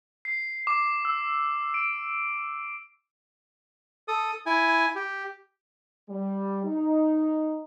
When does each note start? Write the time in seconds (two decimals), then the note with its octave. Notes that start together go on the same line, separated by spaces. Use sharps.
0.25 C7
0.67 D6
1.05 E6
1.74 D7
4.08 A4 D#6
4.46 E4 G#5
4.95 G4
6.09 G3
6.65 D#4